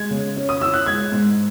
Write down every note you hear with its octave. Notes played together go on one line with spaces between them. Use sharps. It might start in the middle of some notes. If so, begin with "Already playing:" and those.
Already playing: G#3 G#6
C#3
C#4
D#6
E4 E6
F#6
G#3 G#6
G#2